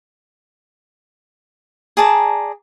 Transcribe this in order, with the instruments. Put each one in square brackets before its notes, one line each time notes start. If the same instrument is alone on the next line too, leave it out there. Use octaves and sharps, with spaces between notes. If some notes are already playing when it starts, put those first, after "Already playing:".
[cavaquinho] G#4 D5 A5 A#5